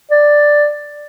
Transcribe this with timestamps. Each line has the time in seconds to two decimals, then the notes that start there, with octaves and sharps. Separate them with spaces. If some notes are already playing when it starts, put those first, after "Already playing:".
0.11 D5